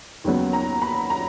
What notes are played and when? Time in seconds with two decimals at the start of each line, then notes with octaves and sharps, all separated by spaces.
0.24 D#2 C#3 F#3 B3
0.53 A#5
0.82 B5
1.10 A#5